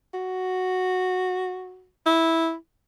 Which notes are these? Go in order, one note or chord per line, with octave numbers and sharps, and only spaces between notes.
F#4
E4